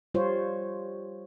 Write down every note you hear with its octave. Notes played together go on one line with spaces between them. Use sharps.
G3 F4 C5 C#5